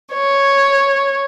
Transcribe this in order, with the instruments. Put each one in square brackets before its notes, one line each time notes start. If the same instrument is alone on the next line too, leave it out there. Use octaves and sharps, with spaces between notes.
[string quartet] C#5